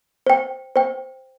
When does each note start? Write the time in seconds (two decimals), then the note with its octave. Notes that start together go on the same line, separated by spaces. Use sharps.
0.27 C5 G5
0.76 C5 G5